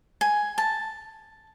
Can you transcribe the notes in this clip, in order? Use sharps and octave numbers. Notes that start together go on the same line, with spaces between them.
G#5
A5